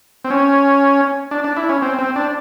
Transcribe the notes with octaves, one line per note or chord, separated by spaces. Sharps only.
C4
C#4
D4
D4
E4
C#4
C4
C4
D4